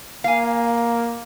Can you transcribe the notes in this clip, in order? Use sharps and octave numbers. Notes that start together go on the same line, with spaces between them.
A#3 F5 G#5